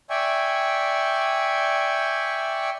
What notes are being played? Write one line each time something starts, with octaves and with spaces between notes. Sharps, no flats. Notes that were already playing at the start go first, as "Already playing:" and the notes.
D5 E5 G5 G#5 C#6